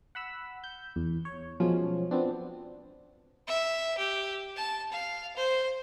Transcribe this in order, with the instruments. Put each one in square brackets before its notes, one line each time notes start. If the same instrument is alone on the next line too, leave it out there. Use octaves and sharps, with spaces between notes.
[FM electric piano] F#5 B5 E6
G6
E2
C#5
B2 F3 F#3 G#3 C#4 F4
F3 B3 C4 D4
[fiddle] E5
G4
A5
F5
C5